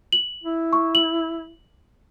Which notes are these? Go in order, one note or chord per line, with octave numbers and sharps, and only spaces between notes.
F#7
E4
C#6
F#7